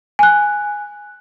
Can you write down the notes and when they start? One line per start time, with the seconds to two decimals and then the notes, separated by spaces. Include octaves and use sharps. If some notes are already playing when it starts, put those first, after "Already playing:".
0.19 G#5 F#6